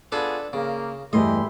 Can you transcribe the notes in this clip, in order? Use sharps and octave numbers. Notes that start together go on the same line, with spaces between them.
B3 D4 F4 G#4 A4 B4
C#3 A#3
E2 G2 A3 E4 G4 D#5 C6